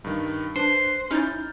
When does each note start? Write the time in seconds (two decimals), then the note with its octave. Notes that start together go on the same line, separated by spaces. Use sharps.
0.04 G2 D#3
0.56 D4 B4 C5
1.11 C#4 D#4 E4 F6 G6 A6